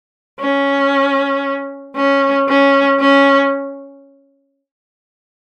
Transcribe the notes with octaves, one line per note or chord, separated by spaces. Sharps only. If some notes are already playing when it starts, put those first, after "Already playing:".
C#4
C#4
C#4
C#4